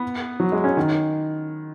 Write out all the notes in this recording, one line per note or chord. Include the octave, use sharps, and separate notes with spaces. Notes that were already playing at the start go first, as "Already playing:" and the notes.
Already playing: B3
F#3
G#3
C#4
D#3